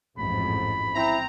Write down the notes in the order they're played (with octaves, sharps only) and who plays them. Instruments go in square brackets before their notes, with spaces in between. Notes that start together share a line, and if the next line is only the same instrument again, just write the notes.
[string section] A1 F2 G#2 [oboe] B5
[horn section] C4 A#5 [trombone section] E4